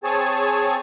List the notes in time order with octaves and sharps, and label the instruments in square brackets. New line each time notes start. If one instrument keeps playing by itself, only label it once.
[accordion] C4 G#4 C#5 G#5 A5